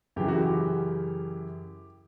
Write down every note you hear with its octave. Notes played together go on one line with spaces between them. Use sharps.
F#2 C#3 E3 G4
F#4
G4